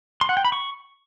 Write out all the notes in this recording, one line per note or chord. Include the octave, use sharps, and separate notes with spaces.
C6
F#5
G5
B5
C#6